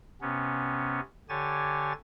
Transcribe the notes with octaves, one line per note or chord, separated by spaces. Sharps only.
C3 B3 C#4
D3 G4 C#5 G#5 A6